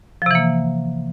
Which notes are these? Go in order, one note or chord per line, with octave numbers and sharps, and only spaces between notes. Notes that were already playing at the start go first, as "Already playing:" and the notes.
C3 E3 F3 A#3